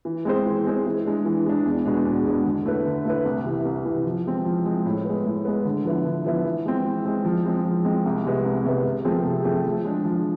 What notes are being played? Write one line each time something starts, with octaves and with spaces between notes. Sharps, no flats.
E3
G#3 C4 G#4 C5
E3
G#3 C4 G#4 C5
E3
G#3 D4
E3
G#3 D4
E2
B2 G#3 D4
E2
B2 G#3 D4
D3
A3 E4 B4
D3
A3 E4 B4
C2
C3 E3
C2
C3 E3
F3
G#3 C4
F3
G#3 C4
A2
G#3 B3
A2
G#3 B3
D3
F3 B3 E4
D3
F3 B3 E4
E3
G#3 C4
E3
G#3 C4
F3
G#3 C4
F3
G#3 C4
C2
C3 G#3 B3
C2
C3 G#3 B3
C3
F3 A3 C4 G#4
C3
F3 A3 C4 G#4
F3
G#3 D4
F3